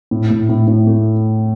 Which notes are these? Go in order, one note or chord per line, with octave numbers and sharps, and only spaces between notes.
A2
A2
A2
A2
A3